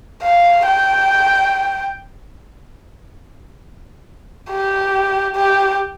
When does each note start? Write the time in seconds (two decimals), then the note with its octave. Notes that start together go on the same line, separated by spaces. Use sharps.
0.23 F5
0.66 G5
4.51 G4
5.36 G4